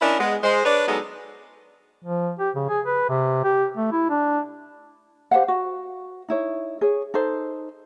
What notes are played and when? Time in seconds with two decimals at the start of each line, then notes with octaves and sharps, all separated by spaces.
0.02 C#4 D4 E4 A#4 D#5
0.19 G#3 B3
0.43 G#3 C5
0.65 D4 B4 C#5 D5
0.88 F#3 G#3 B3 D#4 A4 D#5
2.04 F3
2.39 G4
2.55 C#3
2.69 G#4
2.86 B4
3.09 C3
3.44 G4
3.77 A3
3.92 E4
4.10 D4
5.31 G4 C5 F5 F#5
5.48 F#4
6.28 D#4 E4 C#5
6.81 G#4 C#5
7.14 D#4 A4 C5